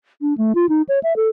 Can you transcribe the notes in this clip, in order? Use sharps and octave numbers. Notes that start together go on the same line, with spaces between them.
D4
A3
F4
D#4
C#5
E5
A4